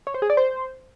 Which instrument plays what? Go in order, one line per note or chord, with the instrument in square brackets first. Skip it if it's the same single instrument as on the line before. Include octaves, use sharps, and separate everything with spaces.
[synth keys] C#5
C5
G#4
D5
C5